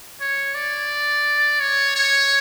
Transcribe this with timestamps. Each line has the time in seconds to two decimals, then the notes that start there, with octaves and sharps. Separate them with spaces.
0.21 C#5
0.55 D5
1.60 C#5
1.96 C#5